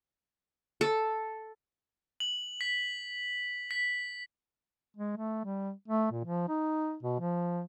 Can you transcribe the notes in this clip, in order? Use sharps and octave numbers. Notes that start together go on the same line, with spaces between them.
A4
F#7
B6
B6
G#3
A3
G3
A3
A#2
F3
D#4
B2
F3